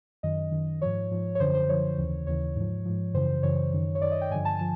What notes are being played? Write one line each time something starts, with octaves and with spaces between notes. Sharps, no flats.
F#2 D#3 D#5
F#2 D#3
G#2 F3 C#5
G#2 F3
C#5
F#2 D3 F3 C5
C5
F#2 D3 F3 C#5
D#2 C#3 E3
D#2 C#3 E3 C#5
G#2 F3
G#2 F3
F#2 C#3 E3 C5
F#2 C#3 E3 C#5
F#2 D#3
C#5
F#2 D#3 D5
D#5
G5
G2 D3 F3 G#5
A5
F3 A5